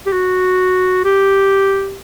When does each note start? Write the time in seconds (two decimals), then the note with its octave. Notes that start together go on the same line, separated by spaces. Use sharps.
0.06 G4
0.13 F#4
1.05 G4